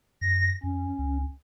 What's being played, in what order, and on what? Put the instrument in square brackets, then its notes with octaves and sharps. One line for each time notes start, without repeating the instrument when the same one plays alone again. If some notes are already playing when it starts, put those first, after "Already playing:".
[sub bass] F#2 [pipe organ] A#6
[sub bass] F2 [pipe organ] C#4
[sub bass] C#2